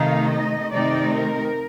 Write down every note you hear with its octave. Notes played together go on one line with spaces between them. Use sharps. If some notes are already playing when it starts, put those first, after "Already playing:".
Already playing: C3 D#3 A3 D#4 F5
D#5
C3 D#3 A3 C4 D#4 D5
A#4